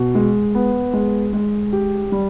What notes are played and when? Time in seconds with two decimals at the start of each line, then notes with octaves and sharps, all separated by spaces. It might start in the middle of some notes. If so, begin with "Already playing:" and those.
Already playing: B2
0.15 G#3
0.55 B3
0.93 G#3
1.33 G#3
1.73 G4
2.12 G3